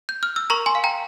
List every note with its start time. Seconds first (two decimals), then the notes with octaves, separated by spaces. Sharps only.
0.09 G6
0.23 F6
0.36 E6
0.50 A#4 A#5 C#6
0.66 G#5 C6
0.75 F5
0.84 G5 A#5